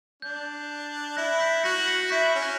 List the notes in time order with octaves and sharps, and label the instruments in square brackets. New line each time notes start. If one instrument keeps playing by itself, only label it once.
[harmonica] D4 [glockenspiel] G6
[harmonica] E4 [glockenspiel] F#6 A#6
[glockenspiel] G6 B6
[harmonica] F#4 [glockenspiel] A#6 C#7
[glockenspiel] A#6 C#7
[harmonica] E4 [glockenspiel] G6 B6
[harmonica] C#4
[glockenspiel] F#6 A#6